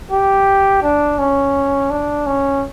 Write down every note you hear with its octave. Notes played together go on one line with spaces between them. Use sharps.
G4
D4
C#4
D4
C#4